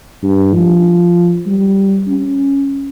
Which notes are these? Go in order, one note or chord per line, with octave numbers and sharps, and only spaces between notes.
G2
F3
G3
C#4